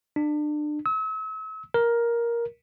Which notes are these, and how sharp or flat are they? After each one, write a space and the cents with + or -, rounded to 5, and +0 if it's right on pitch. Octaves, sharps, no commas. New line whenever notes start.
D4 +30
E6 -40
A#4 +10